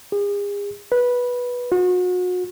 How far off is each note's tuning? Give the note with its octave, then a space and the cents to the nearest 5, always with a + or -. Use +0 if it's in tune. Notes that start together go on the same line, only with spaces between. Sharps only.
G#4 -40
B4 -10
F#4 -35